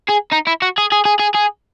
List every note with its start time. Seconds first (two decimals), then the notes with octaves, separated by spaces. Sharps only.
0.09 G#4
0.32 D#4
0.47 E4
0.62 F#4
0.78 G#4
0.92 G#4
1.05 G#4
1.20 G#4
1.35 G#4